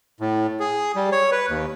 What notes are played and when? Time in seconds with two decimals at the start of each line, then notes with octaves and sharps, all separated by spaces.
0.20 A2
0.60 G#4
0.96 G3
1.12 C#5
1.32 B4
1.49 D#2